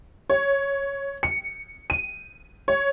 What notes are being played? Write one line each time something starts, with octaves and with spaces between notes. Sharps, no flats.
C#5
C#7
D#7
C#5